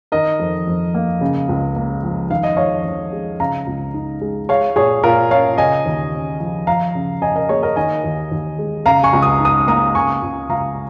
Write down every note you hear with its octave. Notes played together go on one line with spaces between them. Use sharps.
D#3 A#4 D#5
F2
F2
A#3
C#3
C#2
A#3
F3
D#3 F5
D#5
F2 C#5 F5
F2
G#3
C#3 F5 A#5
C#2
D#4
G#3
G#3 C#5 F5
A#2 G#4 C#5
A#2 F4 A#4
C#4 C#5 F5
C#3 D#5 G#5
D#2
C#4
F3
F3 F5 A#5
C#3
C#4 D#5 G#5
A#4 D#5
A#3 G#4 C#5
A#4 D#5
D#3 D#5 G#5
D#2
D#2
G#3
C#3 F5 A#5
G#5 C#6
C#2
D#6
D#4 D#6
A#3 A#5 D#6
C#3 G#5 C#6
C#2
C#2 F5 A#5